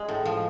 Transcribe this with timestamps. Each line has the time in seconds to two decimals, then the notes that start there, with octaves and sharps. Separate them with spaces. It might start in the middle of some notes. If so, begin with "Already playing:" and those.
Already playing: G#3
0.09 A2
0.25 F3